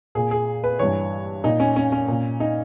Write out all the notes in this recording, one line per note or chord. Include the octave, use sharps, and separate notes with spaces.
A#2 G#4
G#4
B4
G2 E3 C#5
A#2 D#4
C#4
C#4
C#4
A#2
D#4